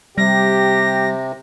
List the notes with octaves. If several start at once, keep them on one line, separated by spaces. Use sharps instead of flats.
C3 G3 G4 A#6